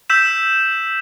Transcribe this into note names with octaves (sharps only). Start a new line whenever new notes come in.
E6 G6 B6 E7